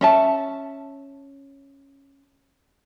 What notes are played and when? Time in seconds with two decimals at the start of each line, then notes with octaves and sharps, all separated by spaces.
0.01 C#4 E5 A5